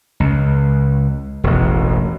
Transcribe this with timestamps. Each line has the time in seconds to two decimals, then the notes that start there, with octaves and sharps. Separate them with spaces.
0.20 C#2
1.44 E1 A1